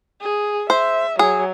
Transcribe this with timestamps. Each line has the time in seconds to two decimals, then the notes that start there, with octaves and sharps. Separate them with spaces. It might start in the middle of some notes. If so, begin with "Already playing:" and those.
0.21 G#4
0.70 C5 E5
1.19 F#3 G#4